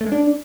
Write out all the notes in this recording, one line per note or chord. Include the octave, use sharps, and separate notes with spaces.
A3
G#3
D4